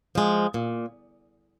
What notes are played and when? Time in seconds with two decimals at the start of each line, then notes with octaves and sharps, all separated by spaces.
0.15 F3 G#3
0.54 A#2